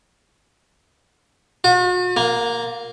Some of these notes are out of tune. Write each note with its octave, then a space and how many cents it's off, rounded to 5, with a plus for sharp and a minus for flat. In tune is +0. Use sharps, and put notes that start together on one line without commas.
F#4 -45
A#3 +0